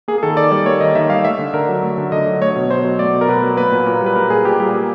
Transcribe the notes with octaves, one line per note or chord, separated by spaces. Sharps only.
A#3 G#4
G#4
D#3 A4
D#3 D5
G3 D5
A#3 C#5
D#3 D#5
D#3 E5
G3 F5
A3 E5
D3
D3 A#4
F#3
A3
D3
D3 D#5
F#3
A3 C#5
B2
B2 C5
F#3
A3 D5
B2
A#4
B2 B4
F#3
A#3 B4
A#2
A#2 A#4
G3
B4
A#3 A#4
A#2 G#4
A#2 G4
G3 G4
A#3